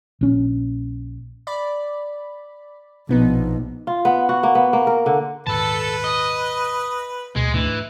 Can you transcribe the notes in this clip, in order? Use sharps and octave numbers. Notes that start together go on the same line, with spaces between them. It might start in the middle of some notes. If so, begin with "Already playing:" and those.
A#1 C#4
D5 B5
A#1 B2 B3 D#4
F4
B3
F#4
A#3
B3
A#3
A#4
D3
D#1 G#2 D#3 A4 B4 A5
D#5
D2 B2 G#3
G#2 E3 A3 D4